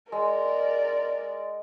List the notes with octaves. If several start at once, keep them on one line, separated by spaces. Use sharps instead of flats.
G#3 A#4 D5